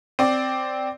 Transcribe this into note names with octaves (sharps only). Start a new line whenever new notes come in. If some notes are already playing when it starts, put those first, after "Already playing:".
C4 D5